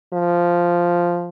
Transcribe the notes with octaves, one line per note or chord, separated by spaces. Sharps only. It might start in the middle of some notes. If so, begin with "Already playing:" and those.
F3